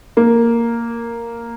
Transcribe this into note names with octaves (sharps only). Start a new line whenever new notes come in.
A#3